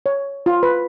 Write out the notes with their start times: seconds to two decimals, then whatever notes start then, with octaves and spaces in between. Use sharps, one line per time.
0.06 C#5
0.46 F4
0.63 B4